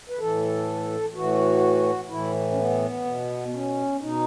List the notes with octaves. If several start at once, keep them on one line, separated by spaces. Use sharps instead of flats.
B4
A2 E3 A4
A2 E3 F#4
A2 E3 E4
C#4
B3
B2
B3
C#4
B2 D#4